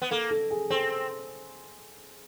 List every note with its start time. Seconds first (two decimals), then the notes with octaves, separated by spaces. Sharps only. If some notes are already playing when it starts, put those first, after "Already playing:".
0.02 B3
0.11 A#3 A4
0.30 A4
0.51 G#4
0.70 C4 A4